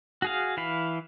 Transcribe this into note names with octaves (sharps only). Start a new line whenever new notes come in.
F#4 G#4 F5
E3 E4 F5 B5